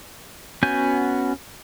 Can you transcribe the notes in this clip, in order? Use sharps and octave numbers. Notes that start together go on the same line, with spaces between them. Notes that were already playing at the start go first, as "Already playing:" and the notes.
B3 C#4 F#4 G#5 G6